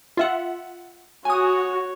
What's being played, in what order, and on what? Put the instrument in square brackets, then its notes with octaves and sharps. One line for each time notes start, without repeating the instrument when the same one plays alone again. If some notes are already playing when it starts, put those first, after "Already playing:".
[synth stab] F4 E5 F#5
[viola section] F#4 [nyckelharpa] C#5 [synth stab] G#5 D#6